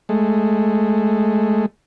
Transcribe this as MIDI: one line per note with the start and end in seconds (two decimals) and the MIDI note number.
0.09 1.66 56
0.09 1.66 57